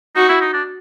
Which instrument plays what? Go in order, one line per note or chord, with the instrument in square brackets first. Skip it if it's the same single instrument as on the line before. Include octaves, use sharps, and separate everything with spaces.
[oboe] D#4 [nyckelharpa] F#4
[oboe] E4
D#4
D4